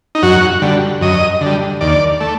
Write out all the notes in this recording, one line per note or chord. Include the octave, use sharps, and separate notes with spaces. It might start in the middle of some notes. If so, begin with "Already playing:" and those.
D#4
F#2 F#4
D3 G3
F#2 D#5
D3
G3
D#2 D5
A3